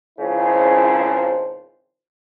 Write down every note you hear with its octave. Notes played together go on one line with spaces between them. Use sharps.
G#1 C#2 C#3 F3 E4 C5